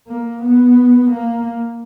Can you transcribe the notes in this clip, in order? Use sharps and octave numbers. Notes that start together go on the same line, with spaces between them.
A#3
B3
A#3